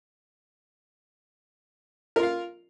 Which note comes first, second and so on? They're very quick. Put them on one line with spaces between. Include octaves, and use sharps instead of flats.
A#4 F4 F5